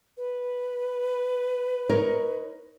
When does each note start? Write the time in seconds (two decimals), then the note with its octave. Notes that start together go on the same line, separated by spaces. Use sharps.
0.17 B4
1.89 D#4 A#4 C#5